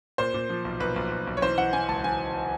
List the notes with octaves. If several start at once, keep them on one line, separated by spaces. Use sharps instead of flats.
A#2 C5
A#2
F3
B1
B1 B4
B1
B1
B1
C#5
E3 C5
E3 F#5
E3 G#5
C#2 A5
E3 G#5